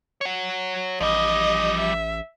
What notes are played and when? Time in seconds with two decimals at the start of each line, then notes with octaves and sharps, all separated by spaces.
0.21 C#5 F#5
1.00 A1 F3 G3 D#5
1.79 E5